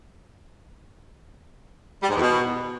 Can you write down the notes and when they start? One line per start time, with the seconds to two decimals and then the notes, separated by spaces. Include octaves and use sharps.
2.03 G3
2.09 G#2
2.15 E2
2.21 B2